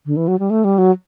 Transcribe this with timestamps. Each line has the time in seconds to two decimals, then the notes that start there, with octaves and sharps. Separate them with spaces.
0.06 D3
0.16 E3
0.28 F#3
0.39 G3
0.50 A3
0.64 G3
0.78 F#3